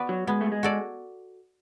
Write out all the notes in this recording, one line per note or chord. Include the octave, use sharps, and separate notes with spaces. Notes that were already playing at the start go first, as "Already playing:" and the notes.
Already playing: B3 F#4 B4 D5
F#3
G#3 B3
A3
G#3
F#4 A4 D5